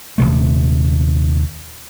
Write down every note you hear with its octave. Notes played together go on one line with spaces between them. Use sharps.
D#1 G#1 C3 A3